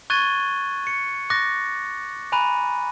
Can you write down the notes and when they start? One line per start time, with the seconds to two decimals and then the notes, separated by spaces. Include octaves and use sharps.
0.10 C#6 F#6 G#6 A6 D#7 G7
0.87 C#7
1.30 C#6 D6 F#6 A6 A#6
2.32 G#5 A#5 B5 F#6 D#7